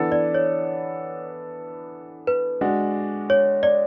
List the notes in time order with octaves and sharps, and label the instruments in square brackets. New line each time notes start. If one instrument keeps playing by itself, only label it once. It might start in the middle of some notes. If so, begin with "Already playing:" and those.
Already playing: [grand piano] E3 B3 D4 A4
[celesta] D5
C#5
B4
[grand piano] G#3 D4 F#4
[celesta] C#5
D5